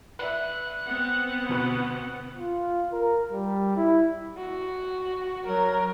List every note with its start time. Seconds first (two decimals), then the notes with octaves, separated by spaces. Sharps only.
0.19 B4 D5 E5 F#6
0.85 B3 C4 F#5
1.49 D2 B2 B4
2.38 F4
2.93 A#4
3.32 G3
3.77 E4
4.37 F#4
5.47 F#3 A#4